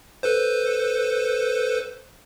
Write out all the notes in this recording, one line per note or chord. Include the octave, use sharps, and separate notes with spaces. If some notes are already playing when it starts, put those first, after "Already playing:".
A4 B4 C5